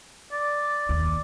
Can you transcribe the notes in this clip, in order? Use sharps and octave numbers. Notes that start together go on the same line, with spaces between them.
D5
D#2